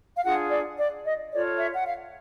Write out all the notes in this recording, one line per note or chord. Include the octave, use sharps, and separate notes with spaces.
F5
D4 F4 G#4 F#5
D5
D5
D#5
F4 A4 C#5 D5
E5
F#5
F5